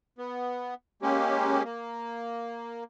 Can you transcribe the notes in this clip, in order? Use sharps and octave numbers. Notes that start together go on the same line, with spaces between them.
B3
G#3 A#3 C#4 G4
A#3